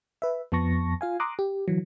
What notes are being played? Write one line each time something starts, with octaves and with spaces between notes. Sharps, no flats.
B4 E5
F2 F3 B3 A5 C#6 A#6
F4 F5 G#5
A#5 C6 D6 D#6 F#6
G4
D3 E3 F#3